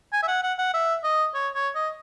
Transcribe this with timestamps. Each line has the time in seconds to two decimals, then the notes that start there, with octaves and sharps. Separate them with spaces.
0.13 G#5
0.23 E5
0.28 F#5
0.43 F#5
0.58 F#5
0.74 E5
1.03 D#5
1.34 C#5
1.54 C#5
1.75 D#5